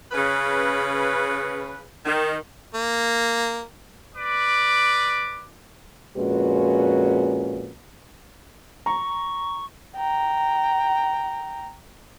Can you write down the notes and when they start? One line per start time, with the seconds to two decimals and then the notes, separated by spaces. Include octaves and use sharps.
0.12 C#3 B4
2.05 D#3
2.74 A#3
4.16 B4 D5 D6
6.17 F2 A#2 G#3 C#4 F#4 B4
8.86 A#5 C#6
9.96 G5 A#5